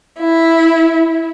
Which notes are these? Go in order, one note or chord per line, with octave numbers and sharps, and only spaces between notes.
E4